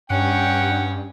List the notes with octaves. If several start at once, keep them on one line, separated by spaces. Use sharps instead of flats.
G2 C#4 F#5 G5